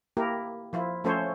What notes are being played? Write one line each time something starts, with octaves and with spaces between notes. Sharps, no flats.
A#3 E4 G4 A#4
F3 E4 F4
F3 A3 C#4 A4 C5 C#5